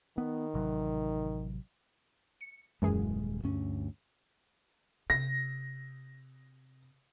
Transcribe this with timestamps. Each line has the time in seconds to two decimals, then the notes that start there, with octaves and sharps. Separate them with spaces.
0.18 D#3 B3
0.54 A1 C3 F#3
2.41 C#7
2.82 D#1 F#2 E3 G#3 G#4
3.44 D2 G2 C#4
5.10 C3 A#6